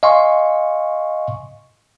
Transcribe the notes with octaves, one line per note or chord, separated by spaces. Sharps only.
D#5 F5 G#5 C6 C#6